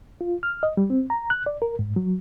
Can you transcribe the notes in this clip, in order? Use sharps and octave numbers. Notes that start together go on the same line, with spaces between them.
F4
F6
D#5
G3
C4
A#5
F#6
D5
A#4
G#2
F#3